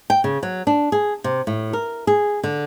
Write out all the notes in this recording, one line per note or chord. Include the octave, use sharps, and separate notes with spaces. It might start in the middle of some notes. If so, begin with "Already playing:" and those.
G5
C#3
F#3
D4
G#4
C3
A2
A#4
G#4
D3